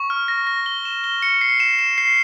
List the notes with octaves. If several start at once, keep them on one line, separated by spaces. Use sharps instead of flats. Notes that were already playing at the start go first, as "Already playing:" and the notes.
Already playing: C#6
F6
A#6
A#6
G7
E7
G7
C#7
C7
E7
E7
C7